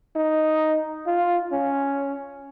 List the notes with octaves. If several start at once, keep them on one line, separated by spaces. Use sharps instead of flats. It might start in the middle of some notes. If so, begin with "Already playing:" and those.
D#4
F4
C#4